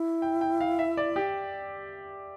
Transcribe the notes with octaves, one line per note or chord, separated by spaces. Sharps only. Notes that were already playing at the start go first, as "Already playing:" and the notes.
Already playing: E4
G5
G5
F5
E5
D5
G4